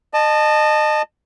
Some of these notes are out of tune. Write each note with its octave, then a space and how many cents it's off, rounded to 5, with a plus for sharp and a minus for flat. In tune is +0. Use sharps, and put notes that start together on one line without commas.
D#5 -30 A5 +0